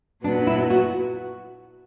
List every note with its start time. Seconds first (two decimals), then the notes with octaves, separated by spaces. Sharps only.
0.24 A#2 F#3 B3 D4
0.47 E4
0.70 F#4